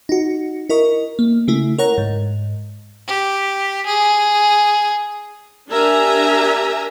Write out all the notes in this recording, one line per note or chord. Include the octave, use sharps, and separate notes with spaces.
D#4 F#4
E4 A#4 D#5 C#6
A#3
C#3 A3 E4
A#4 C#5 F#5 A#5
G#2
G4
G#4
D4 G4 A#4 E5 G#5 A#5